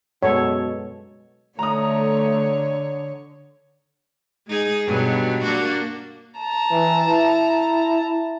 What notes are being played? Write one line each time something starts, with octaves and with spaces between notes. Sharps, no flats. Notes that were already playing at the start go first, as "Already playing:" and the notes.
F#2 B2 G#3 A4 C#5
D3 A3 C#5 A#5 D#6
G#3 D#4 G#4
G2 B2 F#3
A#3 D4 F#4
A5 A#5
E3
E4